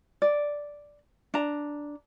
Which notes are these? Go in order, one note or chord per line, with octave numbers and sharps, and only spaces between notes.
D5
D4 A#5